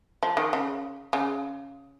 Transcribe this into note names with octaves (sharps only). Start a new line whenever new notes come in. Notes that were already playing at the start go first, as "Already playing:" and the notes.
F3
D#3
C#3
C#3